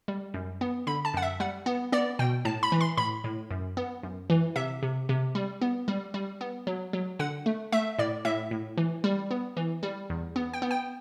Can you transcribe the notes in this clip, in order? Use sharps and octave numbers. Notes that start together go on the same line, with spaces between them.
G3
F#2
B3
D3 B5
A5
F#2 F#5
E5
G3 F#5
B3
B3 D5
B2 G5
A2 A5
B5
E3
C6
A2 B5
A2
F#2
B3
F#2
E3
C3 E5
C3
C3
G3
B3
G3
G3
B3
F#3
F#3
D3 F#5
A3
A3 E5
A2 D5
A2 E5
A2
E3
G3
B3
E3
G3
E2
B3
G5
B3
G5